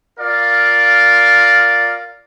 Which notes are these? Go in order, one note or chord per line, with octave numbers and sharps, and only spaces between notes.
F4 A#4 D5 F5